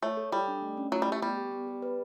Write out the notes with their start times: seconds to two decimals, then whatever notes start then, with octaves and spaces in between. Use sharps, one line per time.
0.02 A3 C#5
0.17 A4
0.32 G3 A4
0.48 D4
0.62 A3
0.77 C#4
0.92 F#3 A3
1.02 G3
1.06 G4
1.12 A3
1.22 G3 B3
1.37 G4
1.51 B3
1.67 G4
1.82 B4